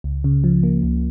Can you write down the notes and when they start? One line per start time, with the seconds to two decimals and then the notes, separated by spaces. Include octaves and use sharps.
0.04 C#2
0.24 C#3
0.44 F3
0.63 A#3
0.83 C#2